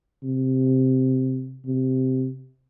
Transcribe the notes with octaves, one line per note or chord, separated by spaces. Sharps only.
C3
C3